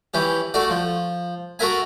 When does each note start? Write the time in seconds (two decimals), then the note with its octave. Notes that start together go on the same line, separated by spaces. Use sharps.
0.14 E3 C#4 G4
0.54 A3 F#4 D5
0.70 F3
1.59 F#4 A4 A#4 E5 G#5